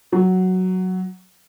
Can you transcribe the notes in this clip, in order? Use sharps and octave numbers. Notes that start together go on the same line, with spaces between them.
F#3